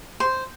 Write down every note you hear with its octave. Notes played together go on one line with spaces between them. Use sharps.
C5